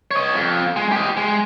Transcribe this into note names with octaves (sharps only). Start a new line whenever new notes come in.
C#5 D#5
F2
G#3
G4 D#5
G#3